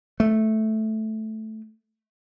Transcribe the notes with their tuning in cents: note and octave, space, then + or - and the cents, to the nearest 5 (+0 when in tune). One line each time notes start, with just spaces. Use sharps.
A3 -10